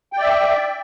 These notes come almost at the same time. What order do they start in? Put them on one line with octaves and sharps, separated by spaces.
G5 D5 E5